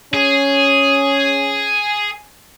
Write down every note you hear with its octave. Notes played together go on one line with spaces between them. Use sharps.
C#4 G#4